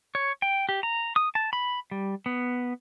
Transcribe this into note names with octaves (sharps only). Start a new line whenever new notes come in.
C#5
G5
G4
A#5
D#6
A5
B5
G3
B3